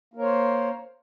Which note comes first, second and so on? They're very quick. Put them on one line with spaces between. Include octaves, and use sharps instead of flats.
A#3 A#4 C#5 C5